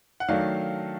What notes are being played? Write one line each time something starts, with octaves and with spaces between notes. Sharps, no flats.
F#5
D#3 F#3 A3 D4 F5